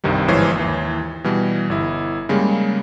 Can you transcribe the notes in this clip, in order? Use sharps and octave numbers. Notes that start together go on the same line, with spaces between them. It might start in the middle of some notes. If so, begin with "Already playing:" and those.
C2 G2 C3 D#3 G3
G1 G#2 E3 F3 C#5 C7
D#2 E3
B2 E3 G3
G1 E4
C#3 G3 G#3 A#3